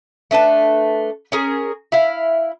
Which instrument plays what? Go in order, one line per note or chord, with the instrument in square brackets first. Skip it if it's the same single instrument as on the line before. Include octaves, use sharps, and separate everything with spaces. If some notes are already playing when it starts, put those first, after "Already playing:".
[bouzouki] A3 D4 B4 A5
C#4 G#4 A#4
E4 F5